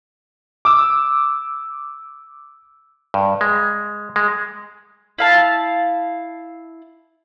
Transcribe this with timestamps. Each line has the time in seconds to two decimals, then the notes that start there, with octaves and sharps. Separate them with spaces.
0.65 D6 E6
3.14 G2
3.41 G#3
4.16 G#3
5.18 E4 F5 A5